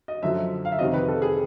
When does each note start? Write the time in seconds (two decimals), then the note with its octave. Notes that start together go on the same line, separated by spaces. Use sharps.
0.08 D#5
0.22 F#2 D3 F3 E5
0.65 F5
0.72 E5
0.79 F2 C3 D#3 D#5
0.94 B4
1.08 A4
1.22 G#4